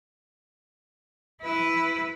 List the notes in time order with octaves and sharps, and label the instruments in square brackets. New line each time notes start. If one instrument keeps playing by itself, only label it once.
[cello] E4 B4